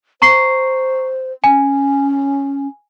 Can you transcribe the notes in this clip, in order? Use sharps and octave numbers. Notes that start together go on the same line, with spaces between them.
C5 A#5 C#6 C7
C#4 G#5